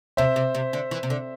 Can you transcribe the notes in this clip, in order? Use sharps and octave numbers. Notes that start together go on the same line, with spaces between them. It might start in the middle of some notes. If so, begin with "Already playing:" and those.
C3 C5 E5
C3
C3
D3
E3
C3
D3